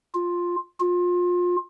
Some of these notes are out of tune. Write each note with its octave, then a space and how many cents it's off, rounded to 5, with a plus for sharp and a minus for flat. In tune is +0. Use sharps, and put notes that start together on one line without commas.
F4 +5
F4 +25